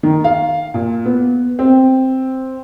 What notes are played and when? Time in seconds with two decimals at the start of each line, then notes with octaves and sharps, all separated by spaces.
0.03 D#3
0.24 F5
0.74 A#2
1.06 B3
1.59 C4